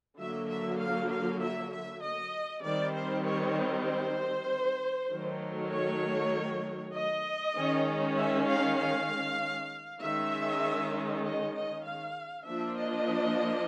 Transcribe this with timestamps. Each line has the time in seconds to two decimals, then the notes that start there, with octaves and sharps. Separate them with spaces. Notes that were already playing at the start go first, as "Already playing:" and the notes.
0.19 D3 F#3 A#3 E5
0.49 E5
0.80 F5
1.11 F5
1.42 E5
1.72 E5
2.03 D#5
2.64 D#3 G3 C4 D5
2.95 C5
3.26 C#5
3.87 C5
5.10 D#3 F#3 A3
5.71 C#5
6.95 D#5
7.56 D#3 G#3 C#4
8.17 E5
8.48 F5
8.79 F5
10.01 D#3 G#3 C#4 E5
11.24 D#5
11.55 D#5
11.85 F5
12.47 F3 A#3 D4 E5
12.78 D#5